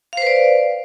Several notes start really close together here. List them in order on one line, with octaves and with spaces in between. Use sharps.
F5 C5 B4 D5